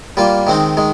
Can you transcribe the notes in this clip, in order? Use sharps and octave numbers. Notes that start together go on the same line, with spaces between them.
G3 A#3 F4
D#3 G#3 C4 D#4
D#3 G#3